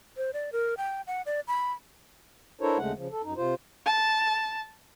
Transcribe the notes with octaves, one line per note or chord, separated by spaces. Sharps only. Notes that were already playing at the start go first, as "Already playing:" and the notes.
C5
D5
A#4
G5
F#5
D5
B5
D4 E4 A4 A#4 C5 C#5
D#2 C#3 G#3 A3 F#5
C#3 F3
A4
F#2 D#4
C3 F4 C5
A5